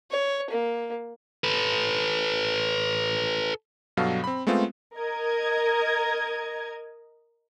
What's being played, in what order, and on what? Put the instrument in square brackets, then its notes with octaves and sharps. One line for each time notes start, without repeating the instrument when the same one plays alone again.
[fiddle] C#5
A#3
[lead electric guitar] A4 B4
[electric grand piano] G2 B2 F#3 A4 F5
C4 B5
G#3 A3 B3 C4 F4
[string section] A#4 D#5 G#6